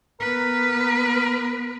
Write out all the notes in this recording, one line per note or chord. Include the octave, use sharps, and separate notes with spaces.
B3 A#4 B4